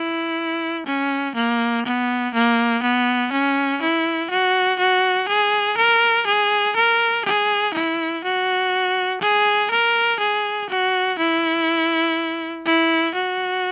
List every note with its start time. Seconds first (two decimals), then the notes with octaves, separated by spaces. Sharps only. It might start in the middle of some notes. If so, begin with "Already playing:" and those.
Already playing: E4
0.86 C#4
1.35 A#3
1.85 B3
2.34 A#3
2.82 B3
3.32 C#4
3.81 E4
4.30 F#4
4.79 F#4
5.28 G#4
5.77 A#4
6.26 G#4
6.76 A#4
7.25 G#4
7.74 E4
8.24 F#4
9.21 G#4
9.70 A#4
10.19 G#4
10.69 F#4
11.18 E4
12.66 E4
13.14 F#4